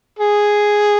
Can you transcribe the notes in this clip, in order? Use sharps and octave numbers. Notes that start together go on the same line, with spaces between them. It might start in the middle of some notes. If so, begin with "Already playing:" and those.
G#4